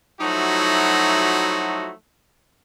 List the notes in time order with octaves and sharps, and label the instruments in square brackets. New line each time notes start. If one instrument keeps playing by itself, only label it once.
[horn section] F3 F#3 A3 D#4 E4 F#4